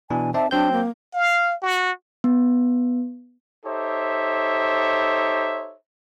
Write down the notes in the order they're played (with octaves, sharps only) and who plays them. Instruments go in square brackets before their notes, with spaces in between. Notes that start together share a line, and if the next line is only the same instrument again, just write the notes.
[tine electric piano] B2 E3 D4 [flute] G#5
[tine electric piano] C4 D#4 D5 [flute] E5 [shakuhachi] A5
[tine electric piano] F#3 C4 G6 [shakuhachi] D4 [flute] G5
[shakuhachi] A#3
[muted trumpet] F5
F#4
[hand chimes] B3
[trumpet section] D#4 G4 A4 C5 C#5 E5